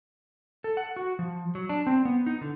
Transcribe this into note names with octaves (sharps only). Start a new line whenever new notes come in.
A4
F#5
F#4
F3
F#3
D4
C4
B3
D#4
D3